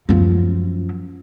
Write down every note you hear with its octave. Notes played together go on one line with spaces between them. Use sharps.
F#2 F3